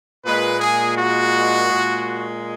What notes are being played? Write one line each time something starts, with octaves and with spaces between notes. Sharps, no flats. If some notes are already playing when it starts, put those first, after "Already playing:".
A#2 G#3 B4
G#4
F#4
A#2 G#3